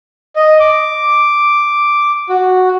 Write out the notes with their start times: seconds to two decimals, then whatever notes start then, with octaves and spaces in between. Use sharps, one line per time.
0.36 D#5
0.60 D6
2.29 F#4